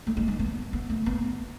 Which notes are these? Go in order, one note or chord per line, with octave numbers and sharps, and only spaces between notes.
A3
G#3
G#3
B3
B3
A3
B3